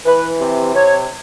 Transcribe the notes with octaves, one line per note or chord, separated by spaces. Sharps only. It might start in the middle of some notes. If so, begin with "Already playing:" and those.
E3 B4
C3
C3 C#5